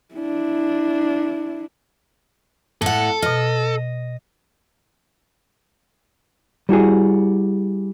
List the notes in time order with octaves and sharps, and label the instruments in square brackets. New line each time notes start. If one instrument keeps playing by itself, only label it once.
[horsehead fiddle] D4 E4
[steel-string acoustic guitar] A2 F#5 [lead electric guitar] A4
[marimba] B2 F6 [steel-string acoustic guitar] D#5
[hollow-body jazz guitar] G3 E4 F#4 G#4